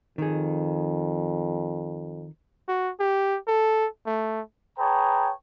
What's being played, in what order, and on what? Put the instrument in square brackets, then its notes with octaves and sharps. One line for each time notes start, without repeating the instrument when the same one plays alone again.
[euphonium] F2 [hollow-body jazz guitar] D#3 G#4
[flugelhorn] F#4
G4
A4
A3
[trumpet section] G#4 B4 C#5 G5 A5 A#5